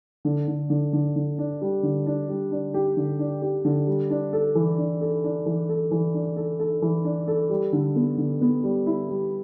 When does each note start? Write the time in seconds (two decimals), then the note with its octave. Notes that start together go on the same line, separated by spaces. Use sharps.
0.25 D3
0.48 D3
0.70 D3
0.93 D3
1.16 D3
1.38 D4
1.61 G3
1.83 D3
2.06 D4
2.29 G3
2.51 D4
2.74 G4
2.97 D3
3.19 D4
3.42 G4
3.65 D3
3.87 G3
4.10 D4
4.33 A4
4.55 E3
4.78 D4
5.01 A4
5.24 D4
5.46 E3
5.69 A4
5.91 E3
6.14 D4
6.36 A4
6.59 A4
6.82 E3
7.04 D4
7.27 A4
7.50 G3
7.73 D3
7.96 B3
8.18 D3
8.41 B3
8.64 G3
8.86 E4
9.09 G3